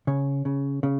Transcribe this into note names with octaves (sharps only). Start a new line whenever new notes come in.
C#3 C#5
C#3
C#3